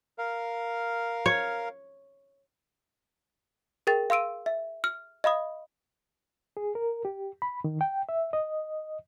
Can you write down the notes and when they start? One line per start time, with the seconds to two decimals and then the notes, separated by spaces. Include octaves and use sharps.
0.18 A#4 F5
1.26 C#5
3.87 G#4 A#4 G5 A6
4.10 F5 C6 E6 D7 D#7
4.46 E5
4.84 F6
5.24 D#5 F5 B5 D#6
6.57 G#4
6.75 A#4
7.05 G4
7.42 B5
7.64 D#3
7.81 G5
8.09 E5
8.33 D#5